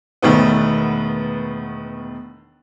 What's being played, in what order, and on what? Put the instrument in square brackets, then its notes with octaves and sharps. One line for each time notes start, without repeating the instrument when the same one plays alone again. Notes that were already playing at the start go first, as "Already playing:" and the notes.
[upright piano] E1 D#3 A3 B3